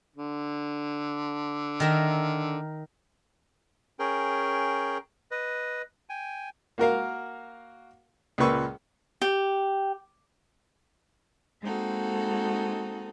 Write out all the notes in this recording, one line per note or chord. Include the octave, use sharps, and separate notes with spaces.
D3
D#3 A#4 E5
C#4 G#4 A#4 G5
B4 D#5
G5 G#5
A#3 F#4 A#4 F5
C#2 A#2 A#3 B4 C#6 E6
G4
G#3 A#3 C4 D#4 F#4 A4